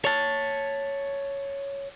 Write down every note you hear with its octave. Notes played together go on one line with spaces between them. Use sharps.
C#5 A5